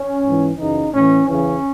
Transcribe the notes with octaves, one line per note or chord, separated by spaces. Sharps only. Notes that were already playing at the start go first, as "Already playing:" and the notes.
Already playing: C#4
G#2 E3
F#2 C#3 E3 D#4
A2 E3 C#4
E2 C#3 E3 C#4